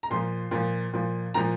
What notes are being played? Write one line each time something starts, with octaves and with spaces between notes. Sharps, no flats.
A#5
A#2 F3 C6
A#2 F3
A#2 F3
A#2 F3 A#5